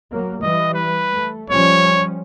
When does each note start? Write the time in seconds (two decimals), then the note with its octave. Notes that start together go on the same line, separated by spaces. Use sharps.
0.12 F#3 A#3
0.42 E3 G3 D#5
0.74 B4
1.13 A3
1.50 F3 G3 C#4 C#5